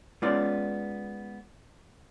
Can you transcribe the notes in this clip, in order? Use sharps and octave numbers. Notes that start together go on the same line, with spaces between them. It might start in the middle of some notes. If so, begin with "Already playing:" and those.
G#3 B3 C#4 F4 D5